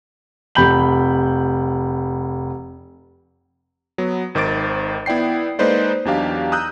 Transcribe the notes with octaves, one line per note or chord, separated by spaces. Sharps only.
F1 B5 G6 F#7
F#3 B3
G#1 D#3 C5 D6 A6 D7
B3 E4 D5 G5 C7
G#3 A#3 D#4 B4 C5 D5
E2 F#3 D4 D#4 G4 F5
A#5 D#6 E6 F#6 G6